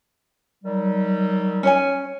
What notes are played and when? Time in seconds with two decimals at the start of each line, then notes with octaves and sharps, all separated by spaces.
0.64 D#3 F#3 G3
1.63 C#4 C#5 G#5